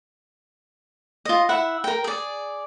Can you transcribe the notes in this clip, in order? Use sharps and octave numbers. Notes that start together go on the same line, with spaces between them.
F4 D#5
E4 E5 F#5
A#4 G5
G#4 D5